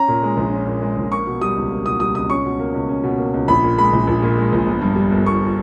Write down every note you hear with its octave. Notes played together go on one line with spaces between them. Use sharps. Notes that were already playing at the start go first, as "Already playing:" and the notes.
Already playing: C#4 A#5
A#2
G#3
A#1
C#4
A#2
G#3
A#1
A#3 C#6
B2
G3 D#6
C#2
A#3
B2 D#6
G3 D#6
C#2 D#6
C#4 C#6
B2
A#3
C#2
C#4
B2
A#3
C#2
A#1 B5
A#2
G#3 B5
A#1
A#1
A#2
G#3
A#1
G1
G2
G3
G1
G1 C#6